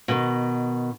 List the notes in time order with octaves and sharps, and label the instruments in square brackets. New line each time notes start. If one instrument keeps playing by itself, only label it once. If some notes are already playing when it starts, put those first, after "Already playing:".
[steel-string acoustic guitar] B2 D#3